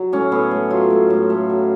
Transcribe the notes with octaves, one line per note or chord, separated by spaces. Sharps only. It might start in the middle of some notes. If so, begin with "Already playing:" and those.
Already playing: F#3
A2 C#4
A2 B3
A3
F#3 F4
A2
A2
A3
F#3